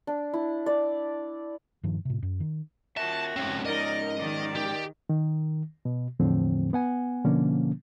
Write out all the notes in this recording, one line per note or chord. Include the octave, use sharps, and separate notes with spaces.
D4
E4
D5
G2 D#3 F3
A2 C3
F#2
D#3
F4 F#4 A#4 E5 A5
G#2 A3 C4 C#4
D#4 A#4 D5 D#5
D#3 D5
G4
D#3
B2
E2 A2 D3 F3 C4
B3 F#5 G#5
B2 D3 F3 A#3 C#4